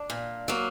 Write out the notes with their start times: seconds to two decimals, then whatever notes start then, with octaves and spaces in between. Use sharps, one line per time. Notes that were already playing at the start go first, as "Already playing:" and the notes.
Already playing: D4
0.10 A#2
0.48 F#3 A#3